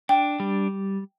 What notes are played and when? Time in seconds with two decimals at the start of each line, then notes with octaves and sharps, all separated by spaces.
0.09 D4 G5
0.40 G3